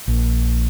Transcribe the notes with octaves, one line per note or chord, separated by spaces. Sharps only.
A#1